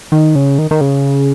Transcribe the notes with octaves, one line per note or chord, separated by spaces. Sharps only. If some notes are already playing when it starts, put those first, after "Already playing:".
D#3
C#3
D#3
D#3
C#3